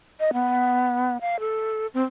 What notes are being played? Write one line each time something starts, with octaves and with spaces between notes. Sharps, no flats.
D#5
B3
F5
A4
C4